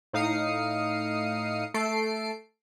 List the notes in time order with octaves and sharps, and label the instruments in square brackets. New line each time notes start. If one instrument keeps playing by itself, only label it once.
[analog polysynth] A2 D#4 F5 D#6 C7 C#7
A3 A4 C7 D7